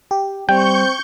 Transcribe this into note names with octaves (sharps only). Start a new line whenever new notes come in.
G4
G3 C4 G5 C#6 G6